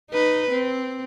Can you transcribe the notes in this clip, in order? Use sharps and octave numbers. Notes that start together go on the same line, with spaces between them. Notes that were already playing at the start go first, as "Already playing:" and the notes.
D#4 B4
C4